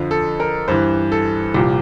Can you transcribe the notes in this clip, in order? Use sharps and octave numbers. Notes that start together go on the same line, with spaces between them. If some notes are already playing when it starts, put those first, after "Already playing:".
Already playing: F2 D3 F3
A4
A#4
G2 E3 C5
A4
C2 A#2 F3 G4